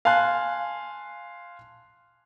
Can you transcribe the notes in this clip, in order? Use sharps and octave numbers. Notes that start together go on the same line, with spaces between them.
F5 G#5 A5 C6 F#6